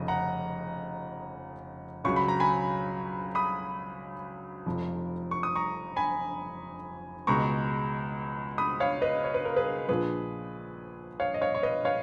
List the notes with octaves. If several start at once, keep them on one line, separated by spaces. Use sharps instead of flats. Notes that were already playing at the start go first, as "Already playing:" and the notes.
Already playing: F1 F2 C#3 D#5
F#5 A#5
C#2 C#3 F#3 C#6
B5
A#5
G#5 B5
B5 D#6
F1 F2 F3
C#6
D#6
A#5 C#6
G#5 B5
C#2 B2 G#3 A#5 C#6
B5 D#6
C#5 F5
B4 D#5
C#5
B4
A#4
G#4 B4
A#1 A#2 F3 G#4 B4
C#5 F5
D#5
C#5 F5
C#5
B4 D#5
C#5 F5